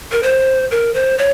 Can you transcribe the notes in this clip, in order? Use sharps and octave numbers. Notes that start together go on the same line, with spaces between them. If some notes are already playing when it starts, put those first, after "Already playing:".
A#4
C5
A#4
C5
C#5